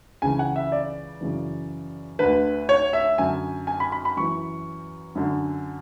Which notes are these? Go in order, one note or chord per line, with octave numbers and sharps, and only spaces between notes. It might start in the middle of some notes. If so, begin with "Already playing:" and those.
C#2 C#3 E3 G#5
F#5
E5
D5
F#2 C#3 E3
D2 D3 B4
C#5
E5
F#2 D3 G#5
G#5
B5
B5
B5
F#2 E3 C#6
F#2 D3